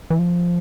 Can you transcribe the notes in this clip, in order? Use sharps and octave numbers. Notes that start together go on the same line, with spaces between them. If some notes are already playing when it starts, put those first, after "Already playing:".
E3
F3